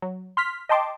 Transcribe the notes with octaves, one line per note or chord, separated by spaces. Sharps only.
F#3
C6 F6 B6
D#5 G5 A5 C6 D6